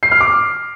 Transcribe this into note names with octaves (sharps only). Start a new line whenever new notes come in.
C7
F6
D6